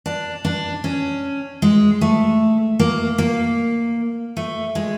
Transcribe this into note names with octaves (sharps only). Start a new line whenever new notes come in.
D4
D4
C#4
G#3
A3
A#3
A#3
A3
G#3